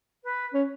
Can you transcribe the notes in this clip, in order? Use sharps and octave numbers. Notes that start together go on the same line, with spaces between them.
B4
C#4